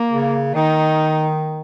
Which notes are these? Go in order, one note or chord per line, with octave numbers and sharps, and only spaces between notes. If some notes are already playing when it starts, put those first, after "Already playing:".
Already playing: A#3
C#3
D#3 D#4